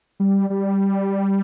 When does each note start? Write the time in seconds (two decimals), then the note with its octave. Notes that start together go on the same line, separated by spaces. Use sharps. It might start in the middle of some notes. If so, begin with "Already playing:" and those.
0.20 G3
0.50 G3